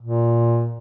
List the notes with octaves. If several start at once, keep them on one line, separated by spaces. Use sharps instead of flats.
A#2